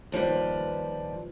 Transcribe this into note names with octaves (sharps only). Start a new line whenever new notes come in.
D#2 F3 G3 B4